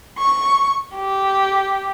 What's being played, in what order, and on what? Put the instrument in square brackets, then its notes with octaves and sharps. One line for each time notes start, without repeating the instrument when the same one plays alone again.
[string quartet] C#6
G4